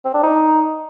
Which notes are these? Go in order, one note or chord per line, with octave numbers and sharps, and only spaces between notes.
C4
D4
D#4